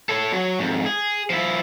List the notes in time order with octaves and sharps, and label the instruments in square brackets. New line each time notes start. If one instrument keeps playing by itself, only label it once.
[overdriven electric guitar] A4 C#5
F#3 C#5
F2 G#2
G#4
F3 E4